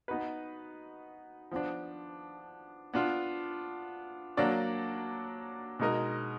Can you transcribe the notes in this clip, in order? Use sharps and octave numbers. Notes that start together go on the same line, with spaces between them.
B3 D#4 F#4 B4
F3 B3 D4
B3 D4 F4
F#3 A#3 D4 F#4 D5
B2 G#3 D#4 A#4 D#5